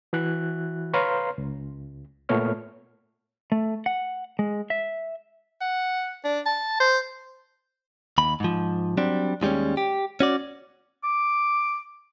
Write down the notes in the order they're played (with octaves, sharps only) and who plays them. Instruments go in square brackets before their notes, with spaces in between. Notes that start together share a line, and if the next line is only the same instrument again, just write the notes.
[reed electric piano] E3 E4 F#4 F#6
B4 C#5 F5 A#5 C6 F6
C#2
A#2 A3 B3 C#5 F6
[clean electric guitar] A3
F#5
G#3
E5
[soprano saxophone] F#5
D4
A5
C5
[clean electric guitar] D#2 B5
G#2 F3
F#3 G3 C4 D4
D#2 F3 G3 G#3 C#4
G4
C#4 F#4 D5
[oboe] D6